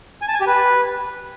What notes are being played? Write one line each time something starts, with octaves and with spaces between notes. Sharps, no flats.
G#5
A5
G#5
G4
B4